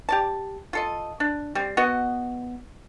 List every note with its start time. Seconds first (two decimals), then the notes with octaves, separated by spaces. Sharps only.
0.09 G4 D5 A5
0.73 F4 A4 D#5
1.20 D4
1.55 G3 C4
1.77 B3 F#4 D#5